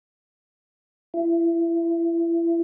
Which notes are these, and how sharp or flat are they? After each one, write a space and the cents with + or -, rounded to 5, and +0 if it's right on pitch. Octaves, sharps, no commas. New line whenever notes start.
E4 +30